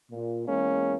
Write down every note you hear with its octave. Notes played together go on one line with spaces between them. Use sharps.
A#2
E2 G#3 A#3 C#4